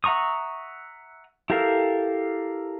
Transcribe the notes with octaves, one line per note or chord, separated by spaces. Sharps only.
E5 F#5 A#5 C#6 D#6
E4 G4 A4 A#4 F5